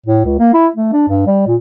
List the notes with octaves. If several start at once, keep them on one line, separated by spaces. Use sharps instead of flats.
A2
C#2
A#3
E4
A3
D4
G2
G3
A#2